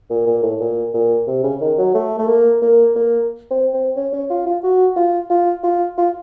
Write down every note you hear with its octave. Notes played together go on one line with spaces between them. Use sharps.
A#2
A#2
A2
A#2
A#2
C3
C#3
D#3
F#3
A3
A3
A#3
A#3
A#3
C4
C4
C#4
C#4
F4
F4
F#4
F4
F4
F4
F4